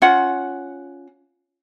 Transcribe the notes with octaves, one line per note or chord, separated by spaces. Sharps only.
C#4 F4 F#5